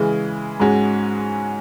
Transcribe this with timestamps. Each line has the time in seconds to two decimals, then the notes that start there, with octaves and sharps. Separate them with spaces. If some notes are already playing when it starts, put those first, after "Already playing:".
Already playing: C#3 E3 G#3
0.60 G#2 G#3 C#4 F#4